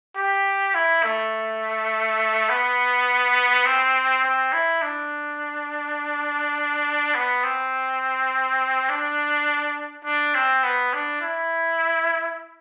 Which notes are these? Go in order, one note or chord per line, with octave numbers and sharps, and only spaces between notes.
G4
E4
A3
B3
C4
C4
E4
D4
B3
C4
D4
D4
C4
B3
D4
E4